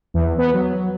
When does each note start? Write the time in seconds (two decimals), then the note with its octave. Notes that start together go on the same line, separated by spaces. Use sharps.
0.14 E2
0.38 B3
0.53 F#3